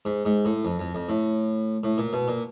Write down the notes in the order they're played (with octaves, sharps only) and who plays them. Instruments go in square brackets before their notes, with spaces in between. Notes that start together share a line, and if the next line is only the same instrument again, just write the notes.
[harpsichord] G#2
G#2
A2
F2
F2
F2
A2
A2
A#2
B2
A#2